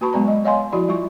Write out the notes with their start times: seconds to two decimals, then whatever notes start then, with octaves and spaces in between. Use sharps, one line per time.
0.01 A#3 F#4 B4 A5 B5 C#6
0.13 F#3 G#3 B3 D5 A#5
0.28 D#5
0.45 C#5 D#5 F5 G#5 C6
0.72 F3 E4 F#4 D5 B5
0.89 G3 F4 C#6